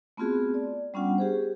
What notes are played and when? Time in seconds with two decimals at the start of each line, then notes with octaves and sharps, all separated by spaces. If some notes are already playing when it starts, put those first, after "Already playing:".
0.17 A3 B3 C4 F4 F#4 G#4
0.54 D5
0.94 G3 B3 C#4 D4 F4 F#5
1.18 G4 G#4 C5